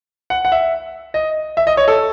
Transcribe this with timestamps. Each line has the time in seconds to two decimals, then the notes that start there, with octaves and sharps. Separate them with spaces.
0.30 F#5
0.45 F#5
0.52 E5
1.14 D#5
1.57 E5
1.67 D#5
1.77 C#5
1.88 A4